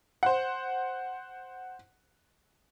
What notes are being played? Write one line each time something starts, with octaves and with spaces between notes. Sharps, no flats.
C5 F#5